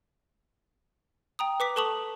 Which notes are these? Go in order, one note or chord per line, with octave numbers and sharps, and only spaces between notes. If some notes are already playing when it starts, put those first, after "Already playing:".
G5 A#5 D#6
B4 D6 B6
A4 B4 A5 C#6 D#6 F#7